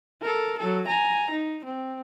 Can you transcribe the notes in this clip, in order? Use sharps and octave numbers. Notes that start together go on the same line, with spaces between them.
A4 A#4
F#3 A4
G#5 A#5
D#4
C4